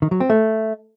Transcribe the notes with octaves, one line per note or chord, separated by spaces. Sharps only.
D#3
F#3
C4
A3